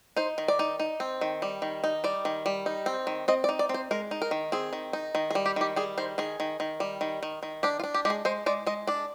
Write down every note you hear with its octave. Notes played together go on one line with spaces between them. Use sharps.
D#4 C5
D#3
D5
D#4
D#4
C4
D#3
G3
D#3
D#4
G3 D5
D#3
G3
D#4
C4
D#3
C4 D#5
D5
D#4
D5
C4
C5
G#3 A#4
D#4
A#4
D#3
C4 G#4
D#3
D#4
D#3
G#4
G3
G4
D#3 G4
G3 G#4
D#3 C5
D#3 G#4
D#3
D#3
G3
D#3
D#3
D#3
D4 G4
F4
D4
G4
G#3 G4
G#4
G#3 C5
G#3 D5
G#3 D#5
D4 D5